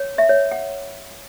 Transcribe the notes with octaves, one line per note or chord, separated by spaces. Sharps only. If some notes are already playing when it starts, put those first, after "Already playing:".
Already playing: C#5
E5
C#5
F#5